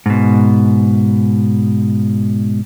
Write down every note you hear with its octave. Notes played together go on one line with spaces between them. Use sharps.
G#2 B2